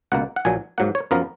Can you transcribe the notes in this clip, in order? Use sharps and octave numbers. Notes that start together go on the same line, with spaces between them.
C#2 B2 A#3 F#5
F#5
A#1 A#2 F#3 G#5
G#2 F#3 A#3 F#5
C#5
F#2 F3 B3 A#4